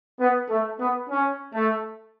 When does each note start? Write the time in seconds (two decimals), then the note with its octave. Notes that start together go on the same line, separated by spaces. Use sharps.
0.19 B3
0.48 A3
0.78 B3
1.08 C#4
1.53 A3